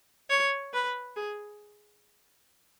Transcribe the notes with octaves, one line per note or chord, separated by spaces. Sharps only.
C#5
B4
G#4